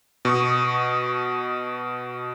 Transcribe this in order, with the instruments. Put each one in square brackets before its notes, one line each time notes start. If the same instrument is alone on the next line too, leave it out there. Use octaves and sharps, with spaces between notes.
[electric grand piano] B2 C#6 D#6